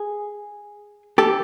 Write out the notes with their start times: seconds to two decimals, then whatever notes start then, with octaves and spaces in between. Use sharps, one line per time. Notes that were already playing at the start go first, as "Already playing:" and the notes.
Already playing: G#4
1.18 G4 A4